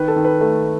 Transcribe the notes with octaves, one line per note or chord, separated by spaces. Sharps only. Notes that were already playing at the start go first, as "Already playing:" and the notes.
Already playing: D#3 B4
A4
D#3
B4
A3